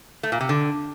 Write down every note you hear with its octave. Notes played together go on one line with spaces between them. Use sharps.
A3
A#2
C3
D3